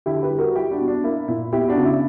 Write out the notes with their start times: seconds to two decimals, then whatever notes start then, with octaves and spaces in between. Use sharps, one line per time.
0.06 D3 E4 G4
0.23 G4 B4
0.30 G3
0.38 F#4 A#4
0.55 G3 E4 G4
0.71 D4 F#4
0.79 B2
0.88 D4
1.04 A#3 E4
1.28 A#2 E4
1.52 B3 E4 G4
1.68 D4 F#4
1.77 C#3
1.85 E4